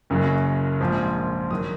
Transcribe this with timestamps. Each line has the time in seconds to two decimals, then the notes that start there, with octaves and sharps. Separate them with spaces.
0.10 F#1 F#2 C#3 F#3
0.80 A#1 G#2 F3
1.51 D#3 F#3 D#6